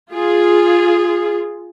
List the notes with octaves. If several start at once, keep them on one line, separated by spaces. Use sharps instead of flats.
F4 G#4